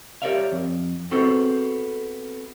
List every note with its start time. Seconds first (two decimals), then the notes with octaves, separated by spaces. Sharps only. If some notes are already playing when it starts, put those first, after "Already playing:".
0.22 G4 A#4 C#5 D5 E5 F5
0.52 F2
1.11 B3 C4 F#4 G#4 A4 C5